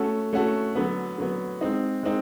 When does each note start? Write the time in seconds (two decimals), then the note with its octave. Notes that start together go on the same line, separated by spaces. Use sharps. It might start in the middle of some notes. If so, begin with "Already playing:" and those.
Already playing: A3 C#4 F#4 A4
0.33 A3 C#4 F#4 A4
0.75 D3 F#3 B3
1.18 D3 F#3 B3
1.61 G#3 C4 D#4
2.03 G#3 C4 D#4